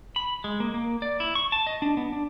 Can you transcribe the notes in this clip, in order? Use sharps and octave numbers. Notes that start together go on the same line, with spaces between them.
B5
G#3
A#3
A#3
D5
E4
C#6
A5
D#5
D4
B3
D4